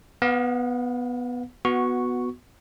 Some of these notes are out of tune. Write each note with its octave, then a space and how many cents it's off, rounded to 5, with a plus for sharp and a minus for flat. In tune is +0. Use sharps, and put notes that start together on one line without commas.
B3 +0 F5 +40
B3 +0 F#4 -10 C#6 +0